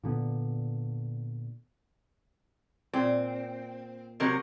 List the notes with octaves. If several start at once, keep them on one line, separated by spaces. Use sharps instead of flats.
A#2 D3 B3
A#2 C4
C3 F#3 A#4